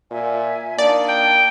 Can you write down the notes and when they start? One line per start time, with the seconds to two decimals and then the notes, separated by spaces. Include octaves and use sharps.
0.11 A#2 E5 G#5
0.79 A#3 D4 D#4 F4 D5
1.08 G5